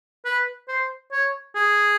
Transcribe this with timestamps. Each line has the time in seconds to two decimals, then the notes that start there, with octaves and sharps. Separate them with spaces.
0.25 B4
0.68 C5
1.12 C#5
1.55 G#4